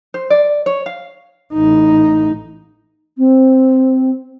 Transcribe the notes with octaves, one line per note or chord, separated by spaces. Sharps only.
C5
D5
C#5
F5
A1 D#4
C4